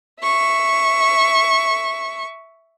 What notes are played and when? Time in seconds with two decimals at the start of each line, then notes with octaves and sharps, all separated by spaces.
0.22 E5 C#6